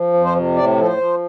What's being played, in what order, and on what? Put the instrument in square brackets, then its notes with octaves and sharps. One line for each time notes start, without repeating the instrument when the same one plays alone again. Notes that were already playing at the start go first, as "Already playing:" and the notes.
Already playing: [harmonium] F3
F2
C5
C3
A2 D5
F3 A4
C5
F3